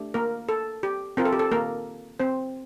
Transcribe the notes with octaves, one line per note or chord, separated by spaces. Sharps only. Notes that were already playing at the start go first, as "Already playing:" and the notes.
Already playing: A3 D4 G4
A#3 A#4
A4
G4
C4 F4 A#4
A4
G4
A4
A#3 A#4
C4 C5